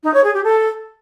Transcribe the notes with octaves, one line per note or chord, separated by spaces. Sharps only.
D#4
C#5
G#4
G4
A4